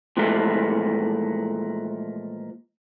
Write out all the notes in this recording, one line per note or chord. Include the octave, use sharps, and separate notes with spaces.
A#2 E3 F3 G#3 A3